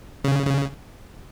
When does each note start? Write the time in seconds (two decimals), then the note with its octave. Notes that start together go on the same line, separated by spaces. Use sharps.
0.24 C#3
0.47 C#3